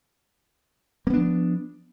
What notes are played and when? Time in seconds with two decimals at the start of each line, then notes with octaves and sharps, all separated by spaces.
1.07 A#3
1.10 B3
1.13 D4
1.17 F3